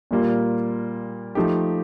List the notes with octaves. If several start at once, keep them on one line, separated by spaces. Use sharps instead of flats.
A#2 G3 A#3 F4
F3 A3 D#4 G4